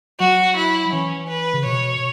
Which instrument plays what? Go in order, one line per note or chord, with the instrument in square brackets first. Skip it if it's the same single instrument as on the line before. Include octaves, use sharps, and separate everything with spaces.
[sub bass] F#3 [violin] F#4
[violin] E4
[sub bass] E3 [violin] C#4
[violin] B4
[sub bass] C#3
[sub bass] B2 [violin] C#5